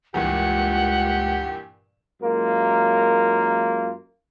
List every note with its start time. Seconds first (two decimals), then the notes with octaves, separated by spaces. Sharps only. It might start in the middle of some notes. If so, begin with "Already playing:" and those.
0.14 C#2 G2 A#2 E3 G4 F#5
2.21 F#2 G#3 A#3 F4 A#4